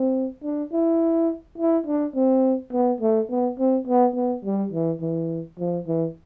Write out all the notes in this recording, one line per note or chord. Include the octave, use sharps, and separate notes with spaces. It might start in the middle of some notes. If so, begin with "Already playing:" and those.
Already playing: C4
D4
E4
E4
D4
C4
B3
A3
B3
C4
B3
B3
G3
E3
E3
F3
E3